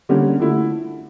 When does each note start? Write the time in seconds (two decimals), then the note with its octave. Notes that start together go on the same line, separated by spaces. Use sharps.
0.09 D3 G3 A#3 C#4 G4
0.39 D3 A3 E4